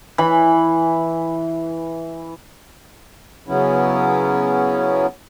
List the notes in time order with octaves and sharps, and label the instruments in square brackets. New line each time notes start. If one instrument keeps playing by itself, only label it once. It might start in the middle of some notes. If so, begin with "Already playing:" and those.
[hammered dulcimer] E3 B5
[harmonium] C#3 F#3 B3 C#4 E4